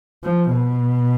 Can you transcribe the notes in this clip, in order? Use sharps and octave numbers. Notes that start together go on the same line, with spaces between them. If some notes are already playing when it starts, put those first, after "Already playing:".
F3
B2